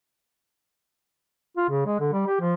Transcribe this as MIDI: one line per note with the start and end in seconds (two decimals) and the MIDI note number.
1.57 1.67 65
1.69 1.83 49
1.86 1.98 56
2.00 2.10 50
2.12 2.24 55
2.27 2.39 67
2.41 2.54 53